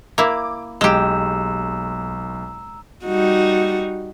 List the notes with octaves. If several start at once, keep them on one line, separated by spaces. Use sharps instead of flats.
A#3 E4 D6
B1 G#3 G4 A#5 E6 E7
G3 D#4 F#4